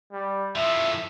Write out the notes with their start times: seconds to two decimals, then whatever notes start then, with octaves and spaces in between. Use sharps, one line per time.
0.13 G3
0.56 A2 F3 E5